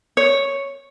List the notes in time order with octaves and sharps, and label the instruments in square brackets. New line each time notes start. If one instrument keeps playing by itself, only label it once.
[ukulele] C#5